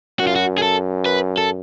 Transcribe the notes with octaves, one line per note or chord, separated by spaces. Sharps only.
F#2 F#4
F4
F#4
G#4
A4
B4
A4